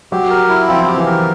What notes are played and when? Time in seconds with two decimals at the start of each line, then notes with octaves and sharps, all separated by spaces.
0.12 F#3 G4
0.30 A#4
0.49 E4
0.69 F3 C4
0.88 G4
0.97 E3
1.06 A#4